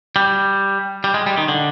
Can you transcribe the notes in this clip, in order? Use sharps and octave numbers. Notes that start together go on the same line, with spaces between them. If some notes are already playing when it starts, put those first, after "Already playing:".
G3
G3
G#3
G3
D#3
D3